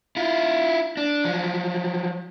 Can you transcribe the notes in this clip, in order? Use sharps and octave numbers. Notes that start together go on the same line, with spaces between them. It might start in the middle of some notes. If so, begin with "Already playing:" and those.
E4 F4
D4
F3 F#3